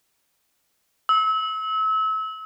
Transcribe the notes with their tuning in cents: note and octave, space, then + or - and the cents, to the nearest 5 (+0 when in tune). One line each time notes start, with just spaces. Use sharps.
E6 -35